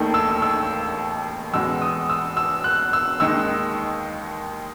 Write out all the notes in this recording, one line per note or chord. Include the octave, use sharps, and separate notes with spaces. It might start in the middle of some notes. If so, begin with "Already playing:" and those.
Already playing: E1 D#2 D#3 A3 D#4
E6
E6
E2 B2 G#3 E6
D#6
E6
E6
F#6
E6
D#2 D#3 G#3 D#4 E6